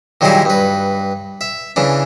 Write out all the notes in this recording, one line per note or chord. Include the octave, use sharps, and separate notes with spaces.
A#2 D#3 F#3 G3 E4 G#4
G2 B4
E5
C#3 E3 D4